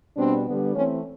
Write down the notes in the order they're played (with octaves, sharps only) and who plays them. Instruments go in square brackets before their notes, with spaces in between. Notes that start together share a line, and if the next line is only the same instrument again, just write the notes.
[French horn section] B2 G3 B3 C4 D4
D3 G3 B3
E3 A3 C4 C#4